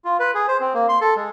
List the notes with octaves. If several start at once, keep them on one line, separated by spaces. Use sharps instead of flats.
F4
B4
G#4
C5
C4
A#3
C6
A4
G#3